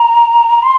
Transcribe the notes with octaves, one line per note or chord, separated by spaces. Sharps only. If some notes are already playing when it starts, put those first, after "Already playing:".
Already playing: A#5
C6